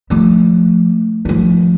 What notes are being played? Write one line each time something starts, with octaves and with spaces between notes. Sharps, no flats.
F3 A3
F3 A3